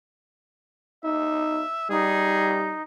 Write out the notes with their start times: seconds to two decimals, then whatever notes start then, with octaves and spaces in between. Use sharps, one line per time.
1.04 D#4 E5
1.90 G3 D#4 G#4